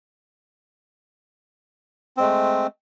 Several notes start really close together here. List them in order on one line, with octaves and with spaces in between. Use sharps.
C4 G#3 A3